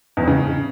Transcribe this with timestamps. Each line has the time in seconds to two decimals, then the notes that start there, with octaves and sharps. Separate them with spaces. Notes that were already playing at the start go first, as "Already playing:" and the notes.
0.17 E2
0.22 F2
0.28 C#3